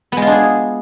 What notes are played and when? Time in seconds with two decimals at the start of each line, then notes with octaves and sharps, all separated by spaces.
0.12 B3
0.17 G#3
0.22 F4
0.27 D4
0.32 G#4